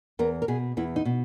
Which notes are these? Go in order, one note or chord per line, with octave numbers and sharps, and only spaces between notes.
E2 A#4
A#4
B2 G#4
E2 E4
D#4
B2